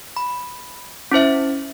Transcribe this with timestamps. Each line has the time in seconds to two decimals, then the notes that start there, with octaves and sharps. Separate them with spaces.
0.17 B5
1.12 C#4 E4 C5 E5